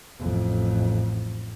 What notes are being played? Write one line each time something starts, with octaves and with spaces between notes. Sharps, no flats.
A1 F2